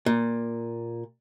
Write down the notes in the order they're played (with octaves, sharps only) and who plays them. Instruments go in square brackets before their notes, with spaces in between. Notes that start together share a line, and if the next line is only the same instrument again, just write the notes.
[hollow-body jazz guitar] A#2